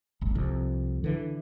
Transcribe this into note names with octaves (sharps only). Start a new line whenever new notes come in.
D#1 G#1
C2 F2
D3 E3